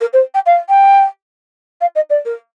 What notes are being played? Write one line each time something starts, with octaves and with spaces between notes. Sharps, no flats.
A#4
C5
G5
F5
G5
F5
D#5
D5
A#4